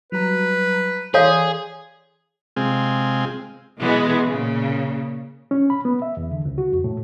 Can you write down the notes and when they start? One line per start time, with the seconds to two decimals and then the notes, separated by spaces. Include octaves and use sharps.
0.12 F#3 G3 B4 A#5
1.14 E3 G#4 A4 C#5 D5 F5 C6
2.56 C3 G#3 C4 F4 G#4
3.79 B2 E3 G#3 B3
4.27 A#2 C#3
5.51 C#4
5.70 B5
5.85 B3
6.02 E5
6.17 E2
6.31 D3
6.45 C#2
6.58 F#4
6.72 F2
6.84 A2